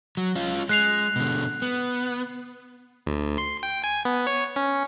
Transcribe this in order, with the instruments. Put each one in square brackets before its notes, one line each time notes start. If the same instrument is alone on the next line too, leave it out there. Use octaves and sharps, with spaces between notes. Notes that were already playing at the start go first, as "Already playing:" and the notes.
[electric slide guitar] F#3
C#4 F4
[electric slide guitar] G#3 [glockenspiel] F#6 C7 F7
[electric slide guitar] B2 D3
B3
[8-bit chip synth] D2
C6
G5
G#5
B3
C#5
C#4